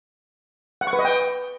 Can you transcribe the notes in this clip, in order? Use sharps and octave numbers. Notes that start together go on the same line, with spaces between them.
F#5
C#6
B4
D#5
G5